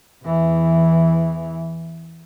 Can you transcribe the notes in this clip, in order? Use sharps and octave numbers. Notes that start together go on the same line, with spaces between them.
E2 E3